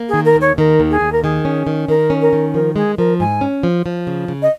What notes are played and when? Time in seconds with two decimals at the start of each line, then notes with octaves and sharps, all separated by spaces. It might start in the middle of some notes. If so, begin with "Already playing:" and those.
Already playing: A#3
0.08 G#4
0.14 D#3
0.25 A#4
0.36 D#2
0.41 C#5
0.58 D#3 A#4
0.80 D#2
0.90 G#4
1.01 D#2
1.12 A#4
1.23 D#3 G#4
1.45 C#4
1.67 D#3
1.88 D#3 A#4
2.10 C#4
2.21 A#4
2.33 D#3
2.54 F3 A#4
2.76 G#3 G#4
2.98 F3 A#4
3.20 G#2 G#5
3.41 C#4
3.63 F3
3.86 F3
4.07 C#3
4.28 C#3
4.42 D#5